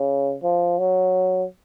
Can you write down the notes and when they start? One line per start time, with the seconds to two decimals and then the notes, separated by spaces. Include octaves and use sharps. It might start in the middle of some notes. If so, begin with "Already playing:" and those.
Already playing: C#3
0.43 F3
0.79 F#3